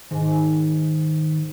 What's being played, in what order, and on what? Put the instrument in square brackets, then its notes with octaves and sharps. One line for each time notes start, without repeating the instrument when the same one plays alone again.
[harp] G#2 [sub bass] D#3